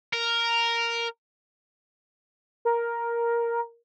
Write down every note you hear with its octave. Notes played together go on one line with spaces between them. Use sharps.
A#4
A#4